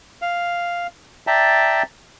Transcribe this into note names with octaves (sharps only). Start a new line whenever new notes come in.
F5
D5 E5 G5 A5 A#5